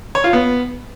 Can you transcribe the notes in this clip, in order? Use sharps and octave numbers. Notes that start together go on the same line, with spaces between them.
C#5
F4
B3